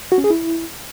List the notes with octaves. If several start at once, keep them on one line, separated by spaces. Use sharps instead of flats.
F#4
C#4
G#4
E4